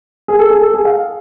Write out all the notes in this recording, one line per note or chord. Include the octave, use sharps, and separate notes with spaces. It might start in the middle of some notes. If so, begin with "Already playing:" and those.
G#4
A4
G#4
A4
G#4
F5